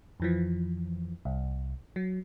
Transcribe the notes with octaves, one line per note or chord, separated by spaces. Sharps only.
F2 E3 F3
C2
F#3